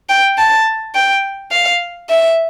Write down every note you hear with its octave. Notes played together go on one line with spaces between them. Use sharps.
G5
A5
G5
F5
E5